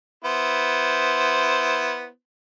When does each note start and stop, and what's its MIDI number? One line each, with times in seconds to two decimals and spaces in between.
0.24 2.07 59
0.24 2.07 64
0.24 2.07 72